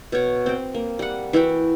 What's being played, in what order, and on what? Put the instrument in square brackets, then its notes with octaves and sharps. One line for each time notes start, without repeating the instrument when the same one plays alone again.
[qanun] B2 C#5
C4 G5
A#3
G3 F#5
E3 E4 F#4 G5